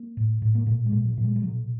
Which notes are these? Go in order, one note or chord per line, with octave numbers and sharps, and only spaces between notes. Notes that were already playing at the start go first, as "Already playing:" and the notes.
Already playing: A#3
A2
A2
A#3
A#2 A3
G#3
A#2
F#3
A#2
G#3
G3
B2 F#3